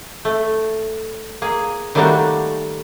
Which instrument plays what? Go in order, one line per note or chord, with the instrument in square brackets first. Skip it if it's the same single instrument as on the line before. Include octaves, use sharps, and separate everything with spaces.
[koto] A3
A#3 G#4
D#3 G3 A3 A#3 D4 F#4